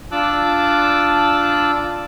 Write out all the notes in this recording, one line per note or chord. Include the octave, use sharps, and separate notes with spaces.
D4 F4 A5 D6 E6 F#6